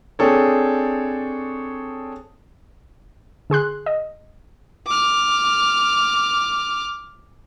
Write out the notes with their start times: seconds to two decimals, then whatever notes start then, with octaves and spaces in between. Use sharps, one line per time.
0.19 C4 D4 G#4 A4 C#5
3.50 D3 G#4 C6 F#6
3.86 D#5
4.87 D6 F6